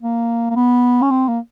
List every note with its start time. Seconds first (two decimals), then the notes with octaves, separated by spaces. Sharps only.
0.01 A#3
0.50 A#3
0.56 B3
1.02 C#4
1.11 C4
1.28 A#3